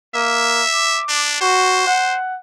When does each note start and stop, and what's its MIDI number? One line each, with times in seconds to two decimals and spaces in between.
0.15 0.62 58
0.15 1.01 76
0.71 1.29 86
1.09 1.38 62
1.41 1.85 66
1.41 2.17 72
1.87 2.35 78